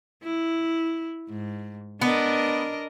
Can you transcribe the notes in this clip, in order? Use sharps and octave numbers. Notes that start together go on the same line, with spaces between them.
E4
G#2
B3 D4 A#4 D#5